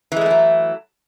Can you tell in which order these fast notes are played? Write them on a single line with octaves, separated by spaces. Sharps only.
E3 G#3 A3 E4 F#3